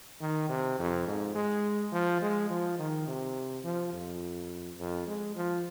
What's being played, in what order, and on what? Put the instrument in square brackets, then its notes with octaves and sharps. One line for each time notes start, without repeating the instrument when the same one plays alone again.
[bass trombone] D#3
C3
F2
G#2
G#3
F3
G#3
F3
D#3
C3
F3
F2
F2
G#3
F3